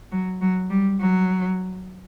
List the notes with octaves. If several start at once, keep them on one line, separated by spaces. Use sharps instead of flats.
F#3
F#3
G3
F#3